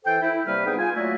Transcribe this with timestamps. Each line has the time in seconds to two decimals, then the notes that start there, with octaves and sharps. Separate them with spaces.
0.05 E3 A4 C5 G5
0.22 E4
0.45 C3 G3 A#3 B4 F6
0.65 B3 D#4 G#4 G5
0.78 F4 G#5
0.96 F#3 A3 A#3 E4 F#4 D5